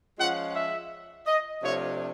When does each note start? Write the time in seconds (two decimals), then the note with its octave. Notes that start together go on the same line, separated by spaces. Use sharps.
0.19 F3 G#3 C#4 F4 F#5
0.55 E5
1.27 D#5
1.63 C3 F3 A3 D4 F4 C#5